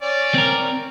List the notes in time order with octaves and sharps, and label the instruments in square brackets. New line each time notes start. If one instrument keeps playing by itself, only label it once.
[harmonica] C#4 D5
[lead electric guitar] C4 A#4